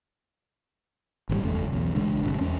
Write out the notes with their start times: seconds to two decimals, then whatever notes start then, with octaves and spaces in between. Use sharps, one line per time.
1.29 G#1 C#3 G3
1.43 F#1 E2 C#3 A3
1.72 B1 E2
1.95 A1 C#3 G#3 D4
2.23 G1 C3
2.41 E2 C#4